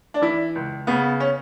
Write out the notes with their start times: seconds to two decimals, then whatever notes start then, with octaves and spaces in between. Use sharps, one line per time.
0.14 D4
0.22 E3 E4
0.55 C#2
0.87 C#3 B3
1.20 C#4